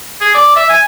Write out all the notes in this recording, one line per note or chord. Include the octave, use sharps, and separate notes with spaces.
G#4
D5
E5
G#5